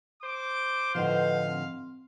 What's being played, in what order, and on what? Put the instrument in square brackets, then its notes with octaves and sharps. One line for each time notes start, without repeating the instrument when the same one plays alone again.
[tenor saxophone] C5 [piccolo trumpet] D6
[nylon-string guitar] A2 D3 F3 [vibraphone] B4 D#5 F#5 [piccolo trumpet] F5
[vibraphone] C4